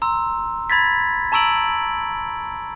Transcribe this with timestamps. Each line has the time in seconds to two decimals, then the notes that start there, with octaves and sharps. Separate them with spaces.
0.02 A#5 C6 E6
0.70 B5 G#6 A6 B6
1.32 A5 A#5 C#6 E6 D7 F#7